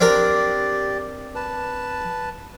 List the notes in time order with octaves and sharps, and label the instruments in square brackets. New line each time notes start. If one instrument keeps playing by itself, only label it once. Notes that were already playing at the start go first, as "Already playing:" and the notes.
[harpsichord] C4 D4 A#4 [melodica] G4 D5
[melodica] B4 A5